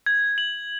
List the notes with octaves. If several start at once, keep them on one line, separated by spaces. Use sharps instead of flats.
G#6
F#7